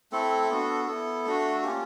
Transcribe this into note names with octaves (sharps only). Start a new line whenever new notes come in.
A3 C4 E4 A4
B3 D4 F#4
B3 E4 A4
A3 D4 F#4
A#3 C#4 F4 G4